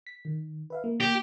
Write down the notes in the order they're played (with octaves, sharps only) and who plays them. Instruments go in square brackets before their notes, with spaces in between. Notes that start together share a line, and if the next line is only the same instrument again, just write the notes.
[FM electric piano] B6
D#3
B4 E5 F5
A#3
[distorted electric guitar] G4